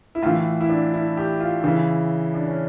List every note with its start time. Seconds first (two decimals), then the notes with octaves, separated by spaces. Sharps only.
0.15 E4
0.23 A2 F4
0.26 E3
0.61 E4
0.69 D4
0.94 E4
1.17 G4
1.40 F4
1.64 C#3 E3 E4
2.34 D4
2.47 C#4